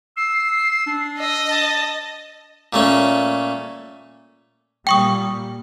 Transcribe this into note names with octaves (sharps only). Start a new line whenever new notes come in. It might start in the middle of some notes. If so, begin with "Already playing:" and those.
E6 C7
D4
D#5 E6
A5
A#2 A3 C#4
A#2 G3 A#3 G5 C#6 D#6